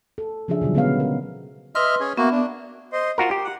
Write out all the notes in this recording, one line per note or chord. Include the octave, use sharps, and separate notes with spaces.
A4
C#3 F3 C#4 D4 G#4 E5
B2 D3 F#3 G3
C#3 G#3 B3 B4 C#5 F5
A#4
B4 D#5 E5 C6 F6
C#4 G#4
A#3 B3 F#4 E5
D4
C5 D#5 C6
F4 F#4 A#4 C6
G4
F#5